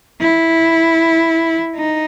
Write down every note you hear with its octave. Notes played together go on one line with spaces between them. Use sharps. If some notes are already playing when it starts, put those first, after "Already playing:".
E4
D#4